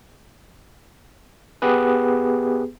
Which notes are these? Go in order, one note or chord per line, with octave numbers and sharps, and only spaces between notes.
B3 G4 G#4 B4